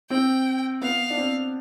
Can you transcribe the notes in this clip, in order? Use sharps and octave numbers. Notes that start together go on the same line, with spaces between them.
C4 G5
B3 F5
D4
C4